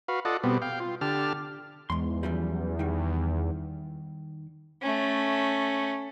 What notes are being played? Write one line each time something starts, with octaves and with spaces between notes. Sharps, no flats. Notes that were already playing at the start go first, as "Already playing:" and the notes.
F#4 B4 F5
F4 A4 D5 D#5 F#5
B2 G3 B3 C4
F5 G5
F4
D3 G4 A5 F6
E2 G#2 C6
F#2 F3 G3
D#3 G3
A3 C#4